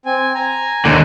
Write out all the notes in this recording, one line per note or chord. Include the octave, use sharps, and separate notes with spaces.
C4 G#5
G#5 A#5
D#2 D3